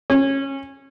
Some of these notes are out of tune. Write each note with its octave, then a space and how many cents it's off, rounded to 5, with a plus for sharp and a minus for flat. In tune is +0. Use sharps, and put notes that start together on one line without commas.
C#4 -20